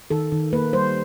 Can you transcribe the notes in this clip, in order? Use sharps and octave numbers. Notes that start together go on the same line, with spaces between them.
D#3 A4
D#3
A#3 B4
G3 C5